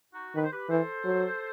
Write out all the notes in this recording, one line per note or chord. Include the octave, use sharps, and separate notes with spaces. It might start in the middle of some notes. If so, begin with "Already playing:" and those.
D#4 F#4
D#3 B4
C5
G4 B4
E3 A4 C5
F#3